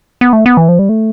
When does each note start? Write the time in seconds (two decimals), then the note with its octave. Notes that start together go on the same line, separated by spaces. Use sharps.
0.21 B3
0.33 A3
0.46 B3
0.57 E3
0.69 F3
0.79 G3
0.89 A3